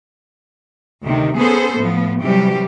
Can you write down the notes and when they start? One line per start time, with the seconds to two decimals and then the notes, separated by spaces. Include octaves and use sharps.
1.04 D2 C3 D#3
1.38 B3 C#4 G#4 A4 C5
1.79 A2 F3 B3
2.21 C3 E3 F#3 G3 G4